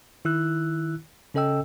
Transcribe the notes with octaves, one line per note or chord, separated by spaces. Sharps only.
D#3 E4 E6 F#6
C#3 C#4 A4 D#5 G5 E6